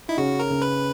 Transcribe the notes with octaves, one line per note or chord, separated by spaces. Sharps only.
D#4 E4
C#3 C#4 F#4
A#4
C#3 C#4
B4